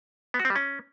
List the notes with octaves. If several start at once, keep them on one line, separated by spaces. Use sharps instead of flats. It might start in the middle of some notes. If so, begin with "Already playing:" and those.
B3
F#4
C4
G3
C#4